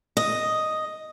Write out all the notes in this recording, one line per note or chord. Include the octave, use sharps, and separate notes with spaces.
D#5